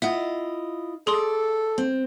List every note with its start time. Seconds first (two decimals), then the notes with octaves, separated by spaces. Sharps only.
0.02 E4 F4 D#5 E5 F#5
1.07 G#4 A4 D5 C6 D#6
1.78 C4